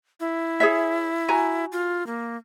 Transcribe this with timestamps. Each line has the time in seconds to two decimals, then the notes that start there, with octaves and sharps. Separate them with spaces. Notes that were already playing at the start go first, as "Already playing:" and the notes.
0.20 E4
0.60 G#4 C#5 E5
1.28 F#4 G#5 A#5
1.72 F4
2.06 A#3